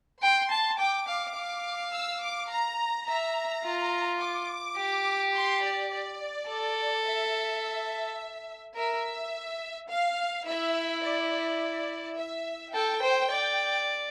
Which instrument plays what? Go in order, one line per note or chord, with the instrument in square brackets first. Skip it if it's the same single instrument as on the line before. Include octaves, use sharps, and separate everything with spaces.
[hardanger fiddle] G5 [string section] C6
[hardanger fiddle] A5
[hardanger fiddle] G5 [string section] D6
[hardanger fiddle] F5
F5
[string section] E6
D6
A#5
[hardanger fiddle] E5 [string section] A#5
[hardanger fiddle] F4
[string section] D6
[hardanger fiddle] G4
[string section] C6
D5
D5
[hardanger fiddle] A4
[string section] E5
[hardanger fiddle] A#4 [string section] E5
[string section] F5
[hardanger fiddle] E4 [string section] E5
[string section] D5
D5
E5
[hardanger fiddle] A4 [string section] G5
[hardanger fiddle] C5
D5